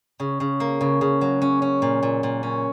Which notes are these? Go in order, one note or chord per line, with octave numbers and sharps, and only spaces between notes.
C#3
C#3
A#3
C#3
C#3
F#3
C#4
C#4
A#2
A#2
A#2
C#4